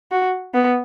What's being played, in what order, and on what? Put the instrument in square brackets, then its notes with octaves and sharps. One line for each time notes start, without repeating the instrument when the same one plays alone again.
[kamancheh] F#4
B3